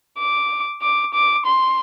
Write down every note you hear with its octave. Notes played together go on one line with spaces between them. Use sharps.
D6
D6
D6
C6